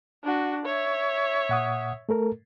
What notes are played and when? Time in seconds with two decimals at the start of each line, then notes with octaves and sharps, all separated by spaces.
0.24 D4 F#4
0.65 C#5 E5
1.49 A#2 F#5 D#6
2.09 A3 A4 A#4